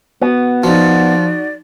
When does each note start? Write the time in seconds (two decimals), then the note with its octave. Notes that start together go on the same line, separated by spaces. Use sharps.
0.22 B3 F#4
0.64 F3 D#4 F#4 D5